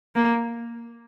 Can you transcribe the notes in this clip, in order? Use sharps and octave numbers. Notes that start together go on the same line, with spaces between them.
A#3